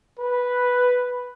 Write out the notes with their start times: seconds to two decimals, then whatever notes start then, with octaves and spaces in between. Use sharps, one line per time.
0.20 B4